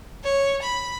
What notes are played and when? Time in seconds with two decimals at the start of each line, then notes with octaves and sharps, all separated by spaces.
0.24 C#5
0.62 B5